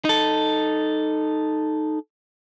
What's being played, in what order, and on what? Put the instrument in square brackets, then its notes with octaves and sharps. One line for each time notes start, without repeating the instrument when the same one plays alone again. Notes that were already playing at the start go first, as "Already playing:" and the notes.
[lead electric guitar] D#4 A4